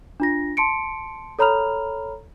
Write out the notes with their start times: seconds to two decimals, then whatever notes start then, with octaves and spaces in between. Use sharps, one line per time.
0.20 D4 F4 A#6
0.57 A5 C6 C#7 D7
1.39 A4 C#5 A#5 B5 F6 F7